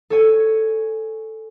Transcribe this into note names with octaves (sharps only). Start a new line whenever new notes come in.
A4 C#5 G#5